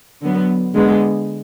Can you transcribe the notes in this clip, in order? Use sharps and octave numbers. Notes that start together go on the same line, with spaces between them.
D3 F#3 B3
D3 G#3 B3